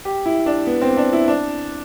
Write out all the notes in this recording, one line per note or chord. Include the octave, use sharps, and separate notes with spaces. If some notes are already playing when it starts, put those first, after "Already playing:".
G4
E4
D4
B3
C4
D4
E4
D4